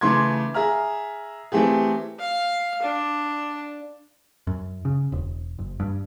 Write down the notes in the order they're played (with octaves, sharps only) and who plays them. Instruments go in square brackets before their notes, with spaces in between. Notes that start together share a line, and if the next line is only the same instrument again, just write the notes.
[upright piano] C#3 E3 A3 C6 D6 G#6
G#4 E5 A#5 F6
E3 A3 C4 G4 G#4
[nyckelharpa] F5
D4
[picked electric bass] F#2
C#3
E1
F#1
G2